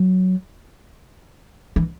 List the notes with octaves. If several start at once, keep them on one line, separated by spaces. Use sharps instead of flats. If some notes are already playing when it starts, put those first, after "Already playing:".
Already playing: F#3
E3